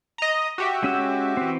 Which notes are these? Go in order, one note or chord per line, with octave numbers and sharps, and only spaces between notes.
D#5 A#5
F#4 G4 E5
G#3 C#4 E6
E3 C4